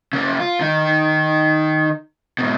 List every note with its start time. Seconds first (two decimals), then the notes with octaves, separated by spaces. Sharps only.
0.13 C#3 A#3
0.40 F4
0.61 D#3 D#4
2.38 G#2 B2